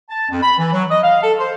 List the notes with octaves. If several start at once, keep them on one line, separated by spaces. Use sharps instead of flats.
A5
F2
B5
E3
F#3
D#5
F5
A4
C5